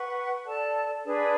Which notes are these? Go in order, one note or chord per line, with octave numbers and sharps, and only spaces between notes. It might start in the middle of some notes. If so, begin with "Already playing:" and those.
Already playing: B4 F#5 C#6
A4 D5 A5
D4 G#4 B4 D5